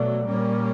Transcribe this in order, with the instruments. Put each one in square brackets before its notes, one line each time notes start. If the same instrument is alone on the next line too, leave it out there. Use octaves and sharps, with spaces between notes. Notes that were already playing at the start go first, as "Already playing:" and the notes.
Already playing: [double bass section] B2 F#3 A3 [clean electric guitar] D5
[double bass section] A#2 G3 A#3 C#4